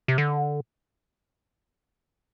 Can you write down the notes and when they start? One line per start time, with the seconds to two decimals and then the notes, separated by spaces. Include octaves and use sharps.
0.08 C3
0.18 D3